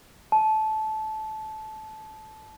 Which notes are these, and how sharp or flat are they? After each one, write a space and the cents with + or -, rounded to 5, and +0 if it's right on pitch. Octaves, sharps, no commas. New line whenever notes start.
A5 -20